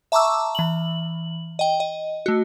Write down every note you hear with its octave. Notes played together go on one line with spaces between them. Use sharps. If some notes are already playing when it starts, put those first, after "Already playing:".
E5 A5 A#5 C#6 D6 E6
E3 F#7
D#5 G5
D#5
A3 F#4